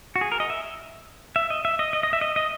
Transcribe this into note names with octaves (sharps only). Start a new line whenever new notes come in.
F#4
G#4
A#4
D#5
E5
E5
D#5
E5
D#5
D#5
D#5
E5
D#5
D#5